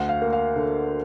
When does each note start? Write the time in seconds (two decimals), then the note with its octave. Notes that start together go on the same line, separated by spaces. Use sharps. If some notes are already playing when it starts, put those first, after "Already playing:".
Already playing: D2 F#5
0.09 F5
0.22 A#3
0.33 F5
0.56 D3